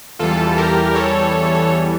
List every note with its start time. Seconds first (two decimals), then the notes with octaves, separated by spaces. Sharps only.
0.19 E2 E3 G3 F4 A4
0.58 G4 A#4
0.95 A4 C#5